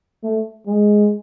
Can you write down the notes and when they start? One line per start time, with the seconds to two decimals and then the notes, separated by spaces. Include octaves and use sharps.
0.23 A3
0.67 G#3